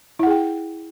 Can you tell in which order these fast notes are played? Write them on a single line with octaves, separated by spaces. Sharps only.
E4 F#5 G#4 G5